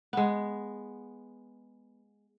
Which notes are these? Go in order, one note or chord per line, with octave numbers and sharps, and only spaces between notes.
G#3 B3